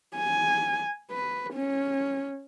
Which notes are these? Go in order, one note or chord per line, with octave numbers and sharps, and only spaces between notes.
G#5
B4
C#4